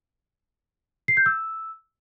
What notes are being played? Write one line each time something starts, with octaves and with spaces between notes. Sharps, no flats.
C7
G6
E6